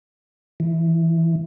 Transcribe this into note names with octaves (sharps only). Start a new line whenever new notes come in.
E3